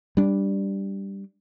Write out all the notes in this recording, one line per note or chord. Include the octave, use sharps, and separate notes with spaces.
G3 D4